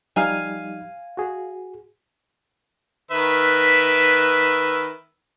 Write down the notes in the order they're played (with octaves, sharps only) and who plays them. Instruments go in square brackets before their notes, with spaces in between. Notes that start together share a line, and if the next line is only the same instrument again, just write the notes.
[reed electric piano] F3 G3 D#4 [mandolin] F5 G#5
[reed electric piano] F#4 G#4
[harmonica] D#3 B4 E5